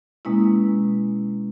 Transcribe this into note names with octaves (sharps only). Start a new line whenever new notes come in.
B2 G#3 A#3 C#4 E4